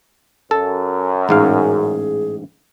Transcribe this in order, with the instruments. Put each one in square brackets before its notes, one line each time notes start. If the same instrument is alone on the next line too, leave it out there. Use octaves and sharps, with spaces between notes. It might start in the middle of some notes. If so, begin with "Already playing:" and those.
[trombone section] F#2 [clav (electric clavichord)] A4
[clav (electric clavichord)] A1 G#2 F5 [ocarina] G#4